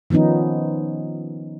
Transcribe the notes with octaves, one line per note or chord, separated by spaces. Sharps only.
D#3 F3 B3 C#4 D#4